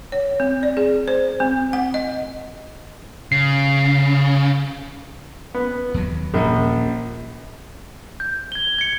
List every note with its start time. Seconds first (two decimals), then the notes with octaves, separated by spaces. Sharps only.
0.12 C#5
0.40 C4
0.63 D5
0.77 G#4
1.08 C5
1.40 C4
1.73 F#5
1.94 D#5
3.32 C#3 C7
5.54 B3
5.94 D#2 F#3
6.34 D#1 A#1 A#2 C#4
8.20 G6
8.52 G#6 G7
8.78 G#6 C#7